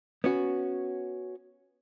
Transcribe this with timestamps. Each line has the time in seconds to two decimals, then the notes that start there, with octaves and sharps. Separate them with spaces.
0.24 B3 C#4 F#4